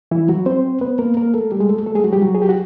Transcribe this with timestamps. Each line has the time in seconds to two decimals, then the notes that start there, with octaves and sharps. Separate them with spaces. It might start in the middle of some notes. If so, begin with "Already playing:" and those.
0.11 E3 E4
0.29 F#3 F#4
0.46 C4 C5
0.81 B3 B4
0.99 A#3 A#4
1.17 A#3 A#4
1.34 A3 A4
1.52 G3 G4
1.60 G#3 G#4
1.69 A3 A4
1.86 A3 A4
1.95 G#3 G#4
2.04 F#3 F#4
2.13 G3 G4
2.22 F#3 F#4
2.34 G#4
2.42 G4
2.49 F#4